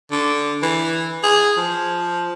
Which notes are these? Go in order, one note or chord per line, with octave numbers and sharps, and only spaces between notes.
D3
E3
G#4
F3